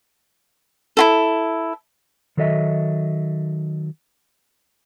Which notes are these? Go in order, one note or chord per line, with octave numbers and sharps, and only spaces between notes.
E4 F4 A4
D#3 F#3 A4 D#5 E5